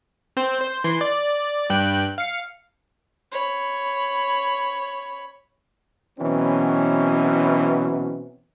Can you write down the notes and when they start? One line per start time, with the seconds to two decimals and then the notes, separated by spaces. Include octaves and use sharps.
0.37 C4 C5
0.61 C5
0.84 E3 C6
1.01 D5
1.70 G2 G5 F#6
2.18 F5 C#7
3.32 C#5 B5
6.19 B2 E3 F#3 C4 C#4